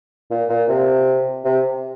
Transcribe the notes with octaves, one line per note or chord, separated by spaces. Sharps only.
A#2
A#2
C3
C3